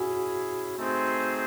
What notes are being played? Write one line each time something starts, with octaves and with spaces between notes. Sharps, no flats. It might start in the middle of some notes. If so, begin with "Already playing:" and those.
Already playing: C#4 E4 F#4 G#4
A3 C4 D#4 G#4 C5